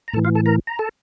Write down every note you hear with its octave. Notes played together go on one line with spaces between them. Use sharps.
A#5
A2 E3 A4 A5
F4 F5
A4 A5
A#4 A#5
A#5
A4 A5